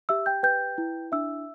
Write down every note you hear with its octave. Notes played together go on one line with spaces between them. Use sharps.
G4 E5 E6
G5 G6
B4 G5 G6
E4
D4 E5 E6